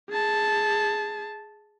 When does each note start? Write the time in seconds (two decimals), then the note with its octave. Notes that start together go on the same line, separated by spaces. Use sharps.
0.11 G#4 A5